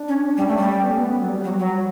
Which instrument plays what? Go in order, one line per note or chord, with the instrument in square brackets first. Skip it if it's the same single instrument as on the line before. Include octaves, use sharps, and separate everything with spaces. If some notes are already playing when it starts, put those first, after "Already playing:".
Already playing: [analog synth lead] D4
[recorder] C#4
[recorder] G3 [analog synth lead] C#4
[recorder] A3
G3
[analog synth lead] B3
A3
B3
F#3
G3
[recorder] F#3
F#3